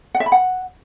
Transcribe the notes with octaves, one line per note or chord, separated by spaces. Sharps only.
F#5
E5
B5
F#5